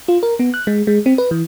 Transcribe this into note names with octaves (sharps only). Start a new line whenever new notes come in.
F4
A#4
B3
F#6
G#3
G#3
C4
B4
E3